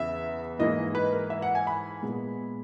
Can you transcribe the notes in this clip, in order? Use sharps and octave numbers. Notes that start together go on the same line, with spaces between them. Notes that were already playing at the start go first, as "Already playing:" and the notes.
Already playing: E2 C#3 E3 B3 E5
G#2 E3 A#3 D#5
B4
A#4
E5
F#5
G#5
B5
A#2 G#3 B3